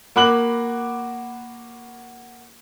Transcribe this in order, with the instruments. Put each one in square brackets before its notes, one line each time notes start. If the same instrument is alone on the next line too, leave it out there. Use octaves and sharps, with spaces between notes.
[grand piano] A#3 F#4 B5 D6 F#6 F#7